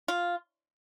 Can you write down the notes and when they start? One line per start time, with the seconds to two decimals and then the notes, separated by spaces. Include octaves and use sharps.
0.08 F4